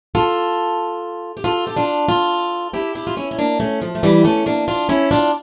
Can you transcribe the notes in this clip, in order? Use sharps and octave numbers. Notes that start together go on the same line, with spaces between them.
F4 A4
G4
F4 A4
G4
D4 F4
F4 A4
E4 G4
E4 G4
F4
C#4 E4
C#4
A#3 D4
A3 C#4
F3
A3
E3 G3
A3 C#4
A#3 D4
D4 F4
C#4 E4
D4 F4